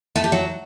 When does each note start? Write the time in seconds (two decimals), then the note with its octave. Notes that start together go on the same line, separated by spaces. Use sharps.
0.16 A3
0.24 G4
0.32 F#3